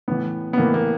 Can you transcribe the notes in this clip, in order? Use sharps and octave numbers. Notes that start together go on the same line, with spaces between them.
A2 E3 B3
B3
A2 E3 A#3
A#3